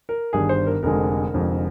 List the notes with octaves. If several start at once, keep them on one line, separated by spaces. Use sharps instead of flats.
A#4
G1 G2 D#3 G#4
C5
A#4
F1 F2 D3 G#3 A#4
F1 F2 D3 G#3